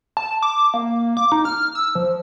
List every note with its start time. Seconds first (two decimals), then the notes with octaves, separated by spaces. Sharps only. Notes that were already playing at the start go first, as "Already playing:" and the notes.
0.17 A5
0.43 D6
0.74 A#3
1.17 D6
1.32 D#4
1.45 F6
1.75 E6
1.95 F3